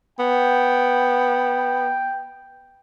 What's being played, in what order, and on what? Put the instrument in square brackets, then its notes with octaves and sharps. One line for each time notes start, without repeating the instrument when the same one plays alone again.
[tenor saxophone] B3 [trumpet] G5